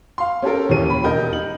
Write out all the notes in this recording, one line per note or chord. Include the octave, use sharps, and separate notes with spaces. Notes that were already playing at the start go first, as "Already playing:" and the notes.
F5 C6
C#4 G4 A4 A#4
D#2 E3 C#4 G4 D#7
B5
E1 G4 A#4 D#5 G6
D#4 F#7